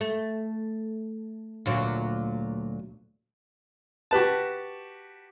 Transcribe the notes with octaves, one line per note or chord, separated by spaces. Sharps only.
A3
D2 A#2 F#3
F#4 G4 B4 A5